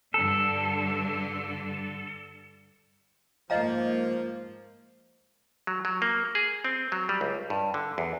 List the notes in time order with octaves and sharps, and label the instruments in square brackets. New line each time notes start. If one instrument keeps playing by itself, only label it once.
[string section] G2 D3 [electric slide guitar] A4
[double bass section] G#2 A#3 [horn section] F3 [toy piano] D#5 F5 A#5
[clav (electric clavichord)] F#3
F#3
A#3
G#4
C4
F#3
G3
C#2
G2
D3
E2